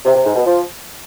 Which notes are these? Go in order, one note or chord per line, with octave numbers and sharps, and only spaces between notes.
C3
C3
G#2
B2
F3